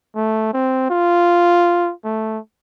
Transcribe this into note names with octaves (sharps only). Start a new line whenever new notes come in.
A3
C4
F4
A3